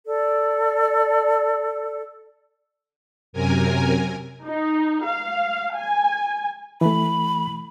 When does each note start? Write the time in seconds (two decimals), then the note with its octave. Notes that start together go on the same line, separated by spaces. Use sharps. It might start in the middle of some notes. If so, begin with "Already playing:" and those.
0.07 A4 D5
3.33 F#2 C3 A#4 G#5
4.45 D#4
5.04 F5
5.74 G#5
6.81 E3 A3 B5